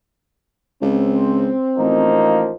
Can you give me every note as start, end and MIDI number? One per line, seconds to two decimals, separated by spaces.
0.82 1.51 37
0.82 2.20 60
1.78 2.49 33
1.78 2.53 53
1.78 2.53 58
1.78 2.53 63